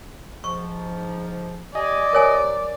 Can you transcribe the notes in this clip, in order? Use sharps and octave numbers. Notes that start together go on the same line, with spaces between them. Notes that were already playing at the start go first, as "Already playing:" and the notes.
G#2 F3 C#6
G4 D5 D#5 G#5
C3 F#3 A#4 C#5 G#5